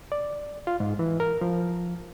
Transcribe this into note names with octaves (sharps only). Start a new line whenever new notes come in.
D5
F4
G#2
E3
A#4
F3